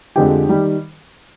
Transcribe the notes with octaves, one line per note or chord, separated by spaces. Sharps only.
F2 D3 F3 G#3 G4 G5
D#3 G3